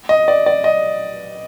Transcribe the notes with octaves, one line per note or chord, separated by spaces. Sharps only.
D#5
D5
D5
D#5